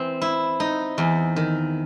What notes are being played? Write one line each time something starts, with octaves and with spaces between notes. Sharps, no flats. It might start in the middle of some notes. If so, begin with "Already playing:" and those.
Already playing: E3 C4
E4
D#4
E2
D#3